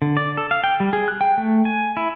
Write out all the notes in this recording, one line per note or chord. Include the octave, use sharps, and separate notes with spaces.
D3
D5
A4
F5
G5
G3
G#4
F#6
G5
A3
G#5
E4